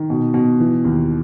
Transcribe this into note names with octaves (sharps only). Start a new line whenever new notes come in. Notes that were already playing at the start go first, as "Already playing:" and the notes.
Already playing: D#3
B2
B2
E3
D#2